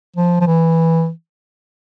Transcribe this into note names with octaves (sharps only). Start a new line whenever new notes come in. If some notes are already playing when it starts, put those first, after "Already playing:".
F3
F3
E3